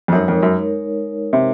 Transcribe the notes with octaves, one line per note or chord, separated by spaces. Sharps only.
F2
F#2 G#3 D#4 A#4 C#5
F2
F#2
C3